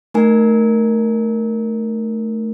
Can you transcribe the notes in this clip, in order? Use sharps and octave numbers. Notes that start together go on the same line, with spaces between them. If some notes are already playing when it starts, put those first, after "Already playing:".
A3 D#4 A#4 G#5